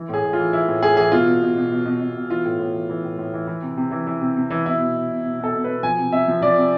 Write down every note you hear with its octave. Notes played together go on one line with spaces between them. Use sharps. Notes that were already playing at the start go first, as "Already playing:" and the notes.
Already playing: E3
A2 G#4
A2
F4
E3
E3 E4
A2
A2 G#4
E3 G#4
B2 F4
B2
B2
B2
B2
B2
B2
B2
E3 F4
A2
A2
E3
E3
A2
A2
E3
E3
C3
C3
E3
E3
C3
C3
E3
B2 E4
B2
B2
B2
B2
B2 A4
B2
B4
B2
F3 G#5
C3
C3 E5
F3
F3 D5
C3